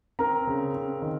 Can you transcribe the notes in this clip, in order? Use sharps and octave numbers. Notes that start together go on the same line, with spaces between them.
C4 A#4 A#5
C#3
C4
D#3